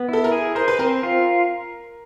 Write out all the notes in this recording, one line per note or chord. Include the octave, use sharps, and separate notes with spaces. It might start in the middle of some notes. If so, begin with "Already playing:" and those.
Already playing: B3
E4 A4
A#4
G#4
A#4 C5
B4
C4 A#4
F4